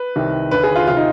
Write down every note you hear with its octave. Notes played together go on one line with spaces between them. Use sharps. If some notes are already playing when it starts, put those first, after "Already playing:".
Already playing: B4
C2 C3 D#3
D#2 D3 B4
G#4
F4
C3 D#3 F4
D#4